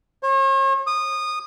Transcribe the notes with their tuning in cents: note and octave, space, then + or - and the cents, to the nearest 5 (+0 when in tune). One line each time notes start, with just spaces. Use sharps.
C#5 -45
D#6 -20